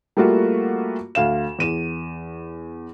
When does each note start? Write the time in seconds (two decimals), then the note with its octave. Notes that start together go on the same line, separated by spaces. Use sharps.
0.17 G3 A3 A#3 F4 F#4
1.15 D2 F5 E7
1.59 E2 D#7 E7